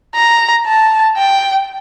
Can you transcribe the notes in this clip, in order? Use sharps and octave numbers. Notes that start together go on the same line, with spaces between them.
A#5
A5
G5